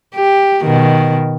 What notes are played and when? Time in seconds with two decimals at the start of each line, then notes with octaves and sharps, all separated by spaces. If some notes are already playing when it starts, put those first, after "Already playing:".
0.15 G4
0.65 B2 D#3